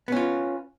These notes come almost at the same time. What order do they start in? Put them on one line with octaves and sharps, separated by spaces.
B3 C#4 F4